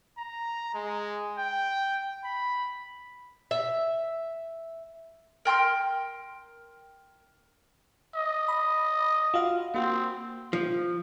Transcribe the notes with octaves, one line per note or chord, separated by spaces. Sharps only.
A#5
G#3
G5
B5
E5
A#4 G5 C6 F6
D#5
B5
F4 F#4 F5
A#3 C4 F#4
F3